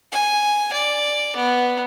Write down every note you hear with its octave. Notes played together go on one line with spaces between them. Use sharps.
G#5
D5
B3